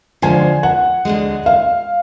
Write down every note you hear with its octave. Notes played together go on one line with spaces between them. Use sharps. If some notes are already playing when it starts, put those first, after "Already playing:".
D2 D3 F3 G#3 G#5
F#5
D2 D3 G#3
F5